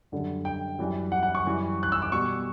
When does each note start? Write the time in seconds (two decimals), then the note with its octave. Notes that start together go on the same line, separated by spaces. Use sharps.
0.12 F#2 D3 G3
0.45 G5
0.79 F#2 E3 G3
1.12 F#5
1.23 F#5
1.35 C#6
1.45 F#2 E3 G3
1.83 F#6
1.92 E6
2.02 D6
2.12 B2 G3 C#6